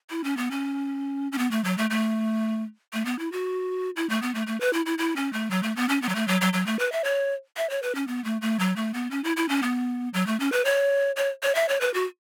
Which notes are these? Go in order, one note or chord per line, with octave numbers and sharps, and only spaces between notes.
E4
C#4
B3
C#4
C#4
B3
A3
F#3
A3
A3
A3
B3
E4
F#4
E4
A3
B3
A3
A3
B4
E4
E4
E4
C#4
A3
F#3
A3
B3
C#4
B3
F#3
A3
F#3
F#3
F#3
A3
B4
E5
C#5
E5
C#5
B4
C#4
B3
A3
A3
F#3
A3
B3
C#4
E4
E4
C#4
B3
F#3
A3
C#4
B4
C#5
C#5
C#5
E5
C#5
B4
F#4